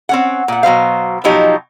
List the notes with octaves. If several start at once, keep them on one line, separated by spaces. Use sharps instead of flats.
C4 C#4 F#5
A#2 F#5
B2 F#3 C5 F5
B2 F3 F#3 D#4 G4